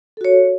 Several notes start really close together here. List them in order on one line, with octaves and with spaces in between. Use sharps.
A4 F#4 C#5